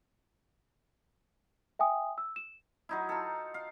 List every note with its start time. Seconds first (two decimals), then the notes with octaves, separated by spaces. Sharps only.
1.79 E5 G5 G#5 D#6
2.18 E6
2.36 E7
2.89 F#3 D#4 E4
3.09 F4 A4
3.54 F5